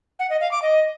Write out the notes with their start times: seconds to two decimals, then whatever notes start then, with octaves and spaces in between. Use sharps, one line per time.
0.19 F#5
0.30 D#5
0.41 F5
0.51 D6
0.62 D#5